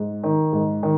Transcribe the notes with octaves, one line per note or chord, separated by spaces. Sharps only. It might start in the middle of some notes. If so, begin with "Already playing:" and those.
Already playing: G#2
D#3
G#2
D#3